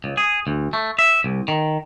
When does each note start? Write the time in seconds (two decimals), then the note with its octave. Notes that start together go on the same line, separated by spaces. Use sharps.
0.04 C#2
0.17 G#4
0.47 D2
0.73 A3
0.99 E5
1.24 C2
1.48 D#3